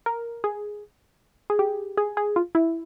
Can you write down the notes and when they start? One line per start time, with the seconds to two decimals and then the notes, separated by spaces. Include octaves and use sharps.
0.06 A#4
0.44 G#4
1.50 G#4
1.59 G4
1.97 G#4
2.17 G#4
2.36 F4
2.55 E4